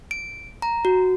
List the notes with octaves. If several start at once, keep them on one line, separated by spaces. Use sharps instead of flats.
D7
A#5
F#4